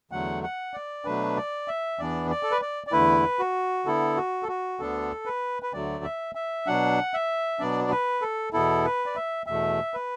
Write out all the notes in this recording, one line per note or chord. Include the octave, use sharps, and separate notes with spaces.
E2 D3 F#3 A3 F#5
F#5
D5
B2 F#3 A3 D4 B4
D5
E5
E2 E3 B3 D4 D5
D5
A4
B4
D5
D5
E2 D3 A3 E4 B4
F#4
D3 B3 E4 A4
F#4
A4
F#4
D2 D3 B3 D4 A4
B4
B4
D2 D3 F#3 A3 D5
E5
E5
B2 F#3 D4 F#5
E5
B2 F#3 B3 D4 D5
D5
B4
A4
E2 B2 B3 E4 A4
B4
D5
E5
E2 B2 A3 E5
B4